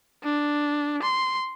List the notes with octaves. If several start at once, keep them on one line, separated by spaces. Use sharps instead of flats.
D4
C6